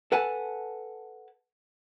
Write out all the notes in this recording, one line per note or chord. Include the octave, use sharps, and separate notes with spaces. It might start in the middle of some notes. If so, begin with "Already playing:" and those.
A4 B4 F#5 G#5 A5